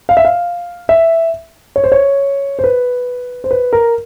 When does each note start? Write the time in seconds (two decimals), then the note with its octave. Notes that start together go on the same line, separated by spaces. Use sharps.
0.09 F5
0.17 E5
0.25 F5
0.89 E5
1.76 C#5
1.84 C5
1.92 C#5
2.59 C5
2.64 B4
3.44 C5
3.51 B4
3.73 A#4